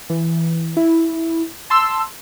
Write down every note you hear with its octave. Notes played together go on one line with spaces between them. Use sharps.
E3
E4
A5 C6 E6